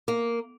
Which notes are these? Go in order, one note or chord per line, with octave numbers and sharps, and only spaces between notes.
A#3